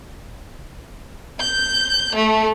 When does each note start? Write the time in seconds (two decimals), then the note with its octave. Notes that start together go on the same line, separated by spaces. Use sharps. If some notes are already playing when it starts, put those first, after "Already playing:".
1.39 G6
2.14 A3